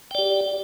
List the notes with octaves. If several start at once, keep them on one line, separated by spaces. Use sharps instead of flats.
G4 D5 G5